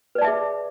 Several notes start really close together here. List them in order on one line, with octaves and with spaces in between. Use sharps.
B4 D5 A5 E5 G#4